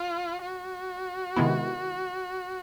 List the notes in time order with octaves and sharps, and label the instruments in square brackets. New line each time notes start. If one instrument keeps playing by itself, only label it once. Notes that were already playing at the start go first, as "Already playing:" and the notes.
Already playing: [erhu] F4
F#4
[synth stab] C3 D#3 G#3 B3 E4